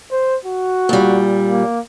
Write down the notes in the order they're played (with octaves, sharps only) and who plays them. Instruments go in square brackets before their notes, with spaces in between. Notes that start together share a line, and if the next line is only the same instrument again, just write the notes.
[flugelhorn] C5
F#4
[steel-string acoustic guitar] A#2 G3
[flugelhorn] A#3